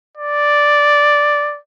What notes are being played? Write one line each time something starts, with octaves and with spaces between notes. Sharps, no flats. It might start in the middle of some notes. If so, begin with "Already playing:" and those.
D5